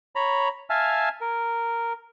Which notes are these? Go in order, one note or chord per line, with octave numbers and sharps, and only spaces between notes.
C#5 A#5 B5
E5 F5 G#5 A5 F6
A#4